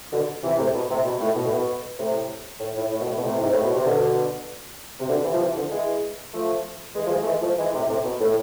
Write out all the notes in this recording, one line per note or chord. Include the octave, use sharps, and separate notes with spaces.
B2 D3
C3 E3
A2 C3
B2
A2 C3
B2
A2
B2
A2
B2
A2 C3
A2
A2
A2
B2
A2
B2
A2 C3
G#2
A2
B2
C3
B2 D3
C3
B2 D3
C3 E3
F3
C3 E3
D3 F3
E3 G#3
F3 A3
E3 G#3
F3
E3 G#3
A3
E3 G#3
F3 A3
E3 G#3
A2 C3
A2 C3
B2
A2